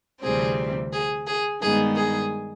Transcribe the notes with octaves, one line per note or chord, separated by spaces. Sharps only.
D2 C3 E3 G3 C4 G#4
G#4
G#4
G2 D#3 G#3 B3 D#4 G#4
G#4